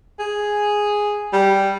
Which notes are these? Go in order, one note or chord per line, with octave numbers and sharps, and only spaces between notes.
G#4
G3